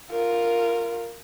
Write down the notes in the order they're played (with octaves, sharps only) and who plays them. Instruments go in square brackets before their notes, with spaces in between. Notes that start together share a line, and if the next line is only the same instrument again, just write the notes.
[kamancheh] F4 A#4